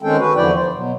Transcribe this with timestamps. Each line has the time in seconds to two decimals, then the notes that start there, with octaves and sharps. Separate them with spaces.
0.03 D#3 G#3 C4 C#4 A4 G5
0.18 F#4 B4
0.36 E2 D3 F3 E4 D5 G5
0.54 C5
0.73 B2 F#3